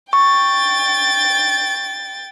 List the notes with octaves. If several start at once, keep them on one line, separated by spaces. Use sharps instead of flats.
G5 C#6 A6